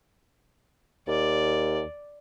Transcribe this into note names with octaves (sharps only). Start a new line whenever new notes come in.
D#2 D5